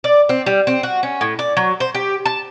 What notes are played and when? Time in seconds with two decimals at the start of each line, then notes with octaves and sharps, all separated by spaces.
0.04 D5
0.29 C4
0.46 G3
0.67 C4
0.83 F#4
1.03 C#4
1.21 A2
1.39 D5
1.57 F#3
1.80 C5
1.95 G4
2.25 A5